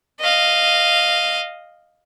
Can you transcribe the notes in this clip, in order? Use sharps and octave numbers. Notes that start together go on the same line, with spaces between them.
D#5 F5